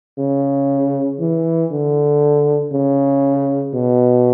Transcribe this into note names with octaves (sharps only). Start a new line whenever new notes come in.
C#3
E3
D3
C#3
B2